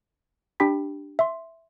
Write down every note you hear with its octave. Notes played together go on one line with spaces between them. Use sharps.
D4 G4 G5 B5 B6
E5 C6